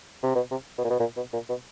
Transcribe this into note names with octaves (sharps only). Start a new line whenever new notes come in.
C3
B2
C3
B2
A#2
B2
A#2
B2
A#2
B2